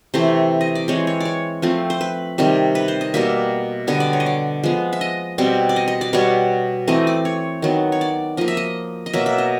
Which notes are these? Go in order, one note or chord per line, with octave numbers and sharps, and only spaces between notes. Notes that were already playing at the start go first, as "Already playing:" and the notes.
C3 E3 A3 C4 C5
D#5
D5
E3 G#3 C4 C#5
C#5
C#5 D5
F3 A3 C4
C5
B4
C3 D#3 G3
B4
C5
D#5
B2 G3 A#3 E5
D3 G3 B3 D#5
D5
C#5
D#5
D5
F3 G#3 B3
E5
D#5
B2 G3 C4
D5
D#5
D#5
D5
B2 G3 B3 C#5
E3 A3 C4 D#5
D5
C#5
D#3 F#3 B3
C#5
D5
F3 A#3 D#5
E5
D#5
D#5
B2 F#3 A#3 E5
E5
D#5